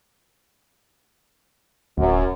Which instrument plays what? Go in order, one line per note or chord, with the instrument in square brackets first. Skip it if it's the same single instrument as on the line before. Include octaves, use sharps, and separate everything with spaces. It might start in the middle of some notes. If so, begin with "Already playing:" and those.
[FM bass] D1 [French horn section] F#2